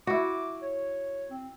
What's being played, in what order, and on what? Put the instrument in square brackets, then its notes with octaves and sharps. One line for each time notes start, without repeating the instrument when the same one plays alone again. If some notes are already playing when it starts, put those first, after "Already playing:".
[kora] E4 F#4 [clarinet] D6
[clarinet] C#5
C4